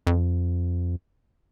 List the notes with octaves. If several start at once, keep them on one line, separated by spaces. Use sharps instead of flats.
F2